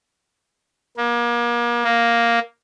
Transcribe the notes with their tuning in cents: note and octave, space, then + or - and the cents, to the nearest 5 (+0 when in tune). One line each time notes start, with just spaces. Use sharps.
A#3 +35
A#3 +0